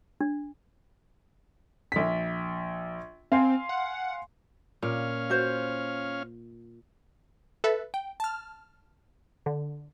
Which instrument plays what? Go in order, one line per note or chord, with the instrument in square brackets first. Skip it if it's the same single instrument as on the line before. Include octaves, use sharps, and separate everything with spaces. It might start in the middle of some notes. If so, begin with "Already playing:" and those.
[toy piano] D4
[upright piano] A#1 B6
[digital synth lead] C4 [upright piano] F5 G#5 C6
[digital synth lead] F#5
[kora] A#2 [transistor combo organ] C#4 F5
[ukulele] F#4 B4 C5
[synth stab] A4 B4 E5
G5
A5 F6
D3